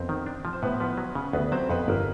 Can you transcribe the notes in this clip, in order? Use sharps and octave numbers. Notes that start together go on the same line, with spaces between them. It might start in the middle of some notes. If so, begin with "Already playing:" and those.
Already playing: F2 B3 C4 B4 C5
D#3
D4
F3
C5
A2 B3 B4
F3 B3 B4
F#3
C#3
D2 B3 B4
F#3 C4 C5
F2 B3 B4
G1 A#3 A#4